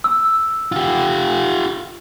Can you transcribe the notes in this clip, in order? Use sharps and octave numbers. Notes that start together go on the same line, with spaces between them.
E6
F4 G4